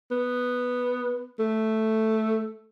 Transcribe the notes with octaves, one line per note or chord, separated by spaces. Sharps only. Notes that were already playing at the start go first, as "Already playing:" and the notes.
B3
A3